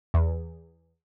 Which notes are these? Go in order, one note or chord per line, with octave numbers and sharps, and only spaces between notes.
E2